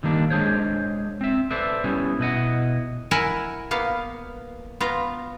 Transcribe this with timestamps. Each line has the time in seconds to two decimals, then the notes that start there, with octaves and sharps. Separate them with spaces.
0.03 D3 D#3 G3 A#3 D4
0.30 G#3 D4 G#4 C5 C#5
1.21 C4 E5
1.51 A4 B4 C5 D5 E5
1.84 G3 B3 C#4 E4
2.19 B2 E4 D#5 F#5
3.11 E4 A#4 F#5 G#5
3.71 A#3 B3 F5
4.80 B3 F4 A#5